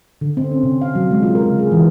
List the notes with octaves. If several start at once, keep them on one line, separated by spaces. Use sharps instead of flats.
D3
C4
C#4
C3
F5
F#3
G#3
F4
A#4
C#3
G#4
E3